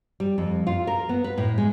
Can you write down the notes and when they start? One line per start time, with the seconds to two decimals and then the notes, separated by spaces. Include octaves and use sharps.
0.20 G3
0.38 F2
0.67 F4
0.87 A#4
1.09 B3
1.24 B4
1.38 A2
1.58 G#3